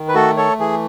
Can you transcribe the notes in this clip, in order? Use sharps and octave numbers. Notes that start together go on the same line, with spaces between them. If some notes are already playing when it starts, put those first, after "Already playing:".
Already playing: D#3
B4
A3 F#4 A4
A4 C#5
E3 G#4